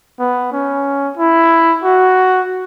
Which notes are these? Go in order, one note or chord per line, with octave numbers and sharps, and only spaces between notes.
B3
C#4
E4
F#4